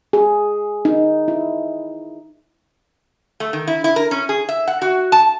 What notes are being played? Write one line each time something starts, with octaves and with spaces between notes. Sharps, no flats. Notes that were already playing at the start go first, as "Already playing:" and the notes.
G#4
D#4
E4
A3
D#3
E4
E4
A#4
C#4
G#4
E5
F#5
F#4
A5